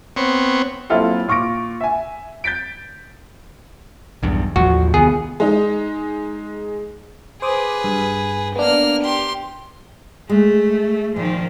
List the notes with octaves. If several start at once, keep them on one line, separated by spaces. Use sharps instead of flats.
B3 C4 C#5
F#3 A#3 C4 E4 F4 A4
A#2 F4 C#6 D6 A#6 D7
E5 G#5
G6 A6 B6 D7
B1 E2 G2
A1 D#2 F3 F#4
C2 D#3 B3 G#4
G#3 D#4
G#4 B4 C5 D6 D#6
G2
A#3 B3 D4 F6
G4 C6
G#3 A3
A#2 D#3 F3